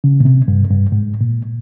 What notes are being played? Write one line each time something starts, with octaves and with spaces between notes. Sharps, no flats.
C#3
A#2
C3
G2
G2
G#2
A#2